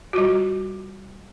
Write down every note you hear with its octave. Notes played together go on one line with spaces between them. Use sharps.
G3 F4 F#4